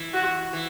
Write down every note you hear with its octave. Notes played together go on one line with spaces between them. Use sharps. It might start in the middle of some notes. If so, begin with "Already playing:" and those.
Already playing: E3
F#4
E3